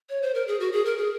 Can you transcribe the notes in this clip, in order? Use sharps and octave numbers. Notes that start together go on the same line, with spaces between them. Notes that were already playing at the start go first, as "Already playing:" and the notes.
C#5
C5
A#4
G#4
F#4
G#4
A#4
G#4